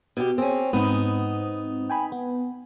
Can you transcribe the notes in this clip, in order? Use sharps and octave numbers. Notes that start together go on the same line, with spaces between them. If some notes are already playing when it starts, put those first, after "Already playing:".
B2 G4
C4 C#4 G#4
G#2 B3 C4 D#4
G5 G#5 B5
B3